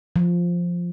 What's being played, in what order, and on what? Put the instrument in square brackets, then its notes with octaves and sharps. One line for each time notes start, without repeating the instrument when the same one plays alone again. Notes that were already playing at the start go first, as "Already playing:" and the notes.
[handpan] F3